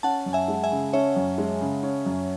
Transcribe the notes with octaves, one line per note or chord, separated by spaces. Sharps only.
C#4 F#5 A5
F#2
E5 G#5
G#3
E5 G#5
C#3
C#4 C#5 E5
F#2
G#3
C#3
C#4
F#2